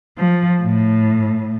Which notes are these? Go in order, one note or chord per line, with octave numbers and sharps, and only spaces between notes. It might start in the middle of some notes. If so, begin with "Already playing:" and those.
F3
A2